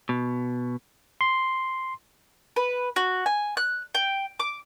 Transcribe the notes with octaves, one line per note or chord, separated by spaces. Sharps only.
B2
C6
B4
F#4
G#5
F#6
G5
D6